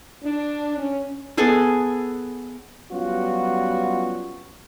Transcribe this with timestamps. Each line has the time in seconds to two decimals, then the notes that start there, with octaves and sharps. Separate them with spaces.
0.23 D4
0.77 C#4
1.37 B3 G#4 A4 G#5
2.91 F#3 G3 B3 C#4 F4 F#4